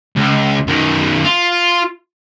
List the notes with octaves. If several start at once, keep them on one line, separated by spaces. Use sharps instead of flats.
C#2
F#2 D#3
F4